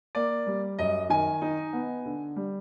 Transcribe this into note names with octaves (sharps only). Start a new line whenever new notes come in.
A#3 D5
G3
F#2 D#5
D#3 G#5
D#4
B3
D3
G3